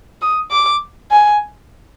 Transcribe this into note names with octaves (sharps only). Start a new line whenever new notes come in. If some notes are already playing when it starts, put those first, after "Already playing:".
D#6
D6
G#5